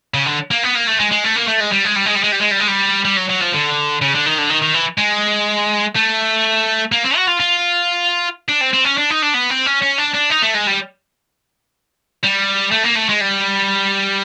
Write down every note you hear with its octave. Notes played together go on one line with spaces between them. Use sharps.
C#3
D3
A#3
B3
A#3
A3
G#3
G#3
A3
A#3
A3
G#3
G3
G#3
G3
G#3
G3
G#3
G3
G#3
G3
G#3
G3
G3
F#3
F#3
F3
D3
C#3
D3
D#3
D3
D#3
D#3
E3
G#3
A3
A#3
C4
F#4
F4
F4
D4
C4
C4
C#4
D4
D#4
D4
B3
C4
C#4
C#4
D4
D4
D#4
A3
G#3
G3
G3
A3
A#3
A3
G#3
G3